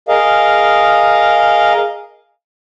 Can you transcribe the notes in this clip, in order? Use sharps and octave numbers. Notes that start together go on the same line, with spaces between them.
G#4 A#4 D#5 F5